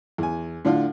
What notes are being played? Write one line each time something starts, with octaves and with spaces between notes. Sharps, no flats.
E2 G#5
A2 D3 D4 F4 F5